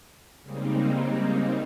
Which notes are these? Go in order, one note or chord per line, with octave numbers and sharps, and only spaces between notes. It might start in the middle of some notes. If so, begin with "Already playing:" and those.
C#3 G3 G#3 A#3 C4 D#4